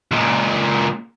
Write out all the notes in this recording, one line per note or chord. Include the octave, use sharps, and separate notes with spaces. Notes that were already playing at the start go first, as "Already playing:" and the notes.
C#2 A#2